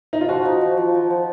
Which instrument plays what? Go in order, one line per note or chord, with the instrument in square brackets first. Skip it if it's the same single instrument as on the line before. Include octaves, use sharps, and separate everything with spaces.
[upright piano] D#4
F4
[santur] F3 [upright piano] F#4
[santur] D#4
F3
F3
F3
F3